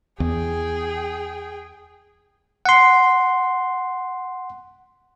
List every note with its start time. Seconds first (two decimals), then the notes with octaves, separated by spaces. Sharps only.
0.20 E2 G#4 G5
2.66 F#5 C6